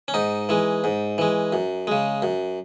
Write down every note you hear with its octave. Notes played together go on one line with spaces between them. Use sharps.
C#4
G#2 D#4
E3 G#3
G#2
E3 G#3
F#2
C#3 G#3
F#2